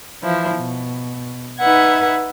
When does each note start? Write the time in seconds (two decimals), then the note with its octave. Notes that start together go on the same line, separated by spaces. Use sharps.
0.23 E3 F3 E4
0.56 B2
1.60 D#4 B4 E5 F#5 G#6